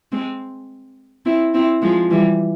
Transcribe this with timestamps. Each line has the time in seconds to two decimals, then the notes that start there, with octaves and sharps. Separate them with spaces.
0.12 G#3 C4
1.26 C4 E4
1.54 C4 E4
1.82 F3 G#3
2.11 E3 G3